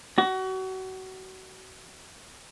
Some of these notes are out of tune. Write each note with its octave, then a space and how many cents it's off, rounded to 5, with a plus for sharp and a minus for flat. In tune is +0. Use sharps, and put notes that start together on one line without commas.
F#4 +30